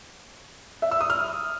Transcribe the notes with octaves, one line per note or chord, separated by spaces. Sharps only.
E5
E6
D#6
F6